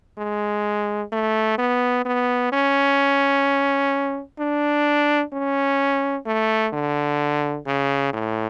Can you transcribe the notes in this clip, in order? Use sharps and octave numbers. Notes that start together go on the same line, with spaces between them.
G#3
A3
B3
B3
C#4
D4
C#4
A3
D3
C#3
A2